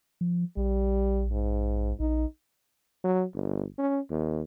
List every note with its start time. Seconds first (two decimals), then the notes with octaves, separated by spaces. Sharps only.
0.21 F3
0.57 A#1 G3
1.31 G#2
2.00 A#1 D#4
3.04 F#3
3.34 G1
3.79 C#4
4.10 D#2